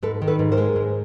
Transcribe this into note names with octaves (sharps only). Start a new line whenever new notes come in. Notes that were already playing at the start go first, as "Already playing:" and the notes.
G#2 A4 B4
D#3
A4 B4
G#2
A#4 C5
G#3
G#2